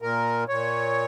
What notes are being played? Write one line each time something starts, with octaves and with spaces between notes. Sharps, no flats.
A#2 A#4
A#2 C#5